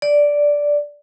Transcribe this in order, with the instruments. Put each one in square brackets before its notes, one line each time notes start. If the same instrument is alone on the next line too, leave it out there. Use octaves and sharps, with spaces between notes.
[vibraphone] D5